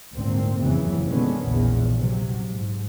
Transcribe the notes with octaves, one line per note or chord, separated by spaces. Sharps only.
G#1 D2 A#2 A#3 C4
F#1 F2 C#3 E3 F#3
B2 D3 D#3 G#3 B3 C#4
A#1 E2
C3 F#3
G#2